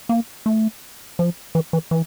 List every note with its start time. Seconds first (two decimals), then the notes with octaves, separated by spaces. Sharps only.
0.09 A#3
0.46 A3
1.19 F3
1.55 E3
1.73 E3
1.91 E3